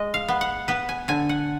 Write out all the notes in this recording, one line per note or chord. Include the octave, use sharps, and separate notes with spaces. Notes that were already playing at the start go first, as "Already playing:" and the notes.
Already playing: G#3 D#5
F5
B3
F#5
B3 B4
G#5
D3 G#5
F#5